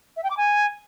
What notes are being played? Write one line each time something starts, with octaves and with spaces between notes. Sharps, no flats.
E5
G5
D6
G#5